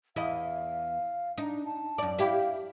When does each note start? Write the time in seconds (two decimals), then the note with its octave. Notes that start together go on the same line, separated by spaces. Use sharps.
0.16 E2 E4 D#5 F5
1.38 D4 D#4
1.66 A5
1.98 F#2 D5
2.18 E4 G4 F5